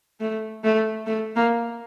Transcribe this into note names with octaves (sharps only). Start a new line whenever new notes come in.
A3
A3
A3
A#3